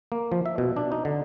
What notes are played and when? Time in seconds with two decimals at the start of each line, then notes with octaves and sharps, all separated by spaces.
0.12 A#3
0.32 F3
0.46 E5
0.58 B2
0.77 D4
0.92 D#4
1.05 D3